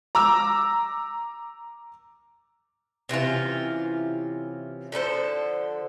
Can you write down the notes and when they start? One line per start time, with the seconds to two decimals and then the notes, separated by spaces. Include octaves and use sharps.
0.15 A#5 D6 E6
3.09 C3 E3 C#4 F4
4.92 D3 F3 A4 C5